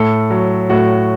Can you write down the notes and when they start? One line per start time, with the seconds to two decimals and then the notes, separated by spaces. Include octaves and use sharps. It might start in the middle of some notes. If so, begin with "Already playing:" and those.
Already playing: A2 A4
0.30 F#3
0.69 A2 F#4